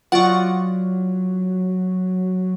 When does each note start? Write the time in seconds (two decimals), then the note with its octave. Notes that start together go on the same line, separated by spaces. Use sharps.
0.12 F#3 F4 D5 D#5 F#5 C#6